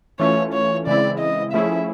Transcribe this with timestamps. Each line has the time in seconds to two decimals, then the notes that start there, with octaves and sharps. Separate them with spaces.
0.19 E3 A3 C#4 F4 C#5
0.53 C#5
0.87 C#3 E3 G#3 C4 E4 D5
1.19 D#5
1.53 F3 A3 C#4 E4 G#4 E5